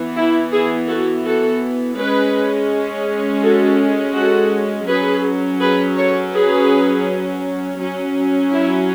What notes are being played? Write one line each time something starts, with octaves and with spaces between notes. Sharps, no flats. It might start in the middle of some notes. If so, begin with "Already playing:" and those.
Already playing: E3 B3
E4
E4 G#4
F#4 A4
F#4 A4
G#3 C#4 G#4 B4
F#4 A4
F#4 A4
F#3 C#4 G#4 B4
G#4 B4
A4 C#5
G#4 B4
F#3 C#4
E4